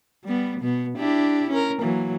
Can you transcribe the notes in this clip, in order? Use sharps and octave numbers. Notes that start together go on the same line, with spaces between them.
G3 B3
B2 B3
D4 E4 G4
C#4 A#4
E3 F#3 A#3